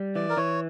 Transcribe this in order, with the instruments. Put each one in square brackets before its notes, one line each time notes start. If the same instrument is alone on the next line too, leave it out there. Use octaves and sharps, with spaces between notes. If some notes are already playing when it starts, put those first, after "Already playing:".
Already playing: [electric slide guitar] G3
[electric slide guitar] E3 [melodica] D5
[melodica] A#4
[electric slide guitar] E3 [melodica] C#5